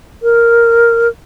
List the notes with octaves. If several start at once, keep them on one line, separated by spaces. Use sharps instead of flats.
A#4